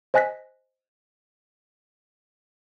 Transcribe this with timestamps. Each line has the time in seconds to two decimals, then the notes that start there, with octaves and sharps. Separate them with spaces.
0.14 C5 D#5 G#5 F#6 A#6 B6